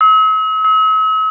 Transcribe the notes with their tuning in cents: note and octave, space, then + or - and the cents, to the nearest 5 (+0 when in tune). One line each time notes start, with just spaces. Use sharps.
E6 -45
E6 -45